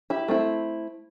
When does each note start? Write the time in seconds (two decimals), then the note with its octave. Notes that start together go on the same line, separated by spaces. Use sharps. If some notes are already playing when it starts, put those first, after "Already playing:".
0.10 E4 G4
0.28 A3 C4 E4